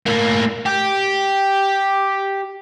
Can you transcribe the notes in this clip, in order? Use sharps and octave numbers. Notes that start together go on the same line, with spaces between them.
A2 A#3
G4